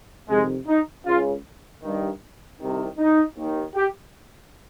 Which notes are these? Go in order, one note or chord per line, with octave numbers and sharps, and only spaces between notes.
F2 C3 D#3 G#3
D#4
C#2 C#3 F4
G2 D#3
C2 C3 D#3
D#4
D#2 D#3
G4